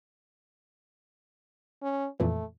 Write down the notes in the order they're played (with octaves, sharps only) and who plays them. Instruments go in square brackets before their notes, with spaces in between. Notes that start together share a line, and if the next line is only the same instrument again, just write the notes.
[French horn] C#4
[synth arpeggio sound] F2 A#2 E3 [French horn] A3